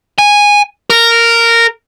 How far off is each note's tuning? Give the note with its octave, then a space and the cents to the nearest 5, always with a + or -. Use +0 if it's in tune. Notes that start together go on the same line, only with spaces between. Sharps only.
G#5 -10
A#4 -10